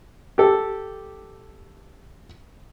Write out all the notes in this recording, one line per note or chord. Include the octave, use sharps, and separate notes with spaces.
G4 A4